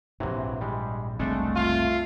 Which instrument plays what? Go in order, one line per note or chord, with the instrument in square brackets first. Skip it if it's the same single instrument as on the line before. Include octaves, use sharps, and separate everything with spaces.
[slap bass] A#1 G#2 [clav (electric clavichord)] C3 E3 F#3
[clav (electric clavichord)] G3 G#3
[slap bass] F#1 C2 C4 [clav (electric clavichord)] G#3 D4 [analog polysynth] A3
[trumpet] F4